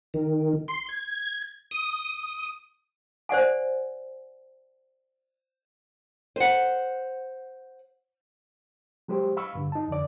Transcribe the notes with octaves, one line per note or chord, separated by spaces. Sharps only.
D#3
C6
G#6
D#6
C5 D5 F#5 G#5
C5 F#5
F#3 G#3 G4 C5
F5 B5 C#6 E6
G2 D3
D#4 A5
F2 D3 D5